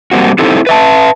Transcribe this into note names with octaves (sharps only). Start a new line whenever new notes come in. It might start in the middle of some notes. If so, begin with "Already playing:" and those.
G3 A#3 C4 F#4
C4 D#4 E4 G4 A4 C5
B4 E5 A5